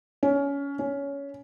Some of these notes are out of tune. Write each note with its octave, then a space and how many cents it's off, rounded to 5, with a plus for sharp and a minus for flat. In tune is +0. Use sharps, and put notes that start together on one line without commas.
C#4 +20
C#4 +15